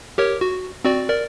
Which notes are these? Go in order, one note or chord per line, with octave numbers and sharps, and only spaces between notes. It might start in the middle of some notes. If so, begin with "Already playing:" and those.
G4 A#4 C#5
F#4
C4 F#4 D5
A#4 D5